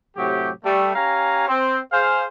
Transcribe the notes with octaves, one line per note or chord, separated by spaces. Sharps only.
A2 C3 F#3 G4
G3 A3
C#4 G4 F5 G#5 A#5
C4
G#4 C5 F5